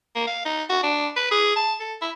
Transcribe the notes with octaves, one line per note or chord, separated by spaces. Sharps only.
A#3
F5
D#4
F#4
D4
B4
G#4
A5
A4
E4